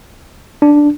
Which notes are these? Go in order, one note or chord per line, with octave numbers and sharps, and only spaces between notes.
D4